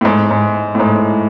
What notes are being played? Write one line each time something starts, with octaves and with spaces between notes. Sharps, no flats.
A2
G#2
G#2
A2
G#2